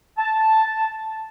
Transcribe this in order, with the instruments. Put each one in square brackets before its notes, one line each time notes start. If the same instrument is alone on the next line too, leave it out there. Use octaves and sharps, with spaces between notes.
[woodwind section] A5